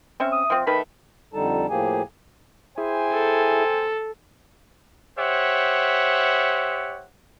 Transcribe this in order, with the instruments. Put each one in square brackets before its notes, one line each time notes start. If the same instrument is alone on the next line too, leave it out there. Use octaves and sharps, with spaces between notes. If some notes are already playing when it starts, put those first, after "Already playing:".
[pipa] C4 C#4 E5
[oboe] D#6
[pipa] F3 C4
[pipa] D#3 A3 B4 [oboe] B5
[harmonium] F2 D3 G3 D#4 A4 A5
A2 F3 A#3 G4 G#4 G#5
[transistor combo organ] E4 G#4 [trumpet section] C5 G5 G#5
[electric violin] A4
[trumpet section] G4 C5 C#5 E5 F#5